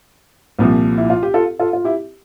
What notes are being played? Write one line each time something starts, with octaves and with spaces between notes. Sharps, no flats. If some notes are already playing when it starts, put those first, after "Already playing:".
C2 A#2 F3
E4
F4
G4
F4 A4
F4 A4
F4
E4 G4